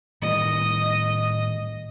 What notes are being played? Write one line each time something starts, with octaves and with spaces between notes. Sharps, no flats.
A2 D#3 G3 D#5